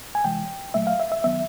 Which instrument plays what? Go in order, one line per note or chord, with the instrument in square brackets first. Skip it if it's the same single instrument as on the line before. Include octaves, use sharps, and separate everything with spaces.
[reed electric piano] G#5
C3 E3 G#3 G5
A#2 F#3 A3 E5
F5
E5
E5
D#3 F#3 B3 E5